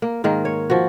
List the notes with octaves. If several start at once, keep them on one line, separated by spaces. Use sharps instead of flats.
A#3
G#2 D#3 A#3
C#5
F3 F#4